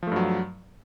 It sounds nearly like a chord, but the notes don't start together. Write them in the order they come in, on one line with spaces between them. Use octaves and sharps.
F3 A3 G2 F#3